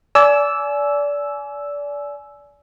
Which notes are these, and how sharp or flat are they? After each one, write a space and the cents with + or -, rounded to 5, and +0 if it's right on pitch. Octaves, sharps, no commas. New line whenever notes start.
D5 -25 G#5 +25 E6 +0